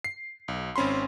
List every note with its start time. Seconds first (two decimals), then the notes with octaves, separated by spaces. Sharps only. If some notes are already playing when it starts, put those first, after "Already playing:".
0.04 C7
0.48 B1
0.76 G#1 C4 C#4 B5 C6